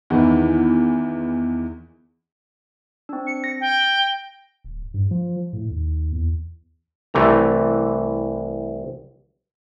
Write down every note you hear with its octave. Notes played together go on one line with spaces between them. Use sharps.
E2 D#3 E3
C4 D4
C#7
A#6
G5
D1
G2
F3
A2
D#2
E2
C2 C3 E3 A3 A#5